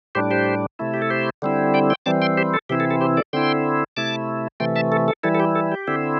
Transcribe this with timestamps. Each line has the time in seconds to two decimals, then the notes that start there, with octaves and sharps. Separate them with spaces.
0.15 A2 G3 D4 G4 C5
0.31 G4 C5
0.79 C3 A3 E4
0.94 G4
1.02 A4
1.10 G4 C5
1.42 D3 G3 C4 E4
1.74 D5 G5
1.90 G5 C6
2.06 E3 G3 C4 A5 D6
2.22 G5 C6
2.37 G4 C5
2.54 A4
2.69 C3 E3 C4 E4 G4
2.80 A4
2.91 A4
3.01 G4 C5
3.17 A4 D5
3.33 D3 C4 E4 G5 C6
3.97 C3 A3 E4 A5 D6
4.60 C3 E3 A3 G5 C6
4.76 E5 A5
4.92 A4
5.08 A4
5.23 E3 G3 E4 A4
5.35 A4
5.40 G4
5.55 A4
5.72 G4
5.87 D3 C4 E4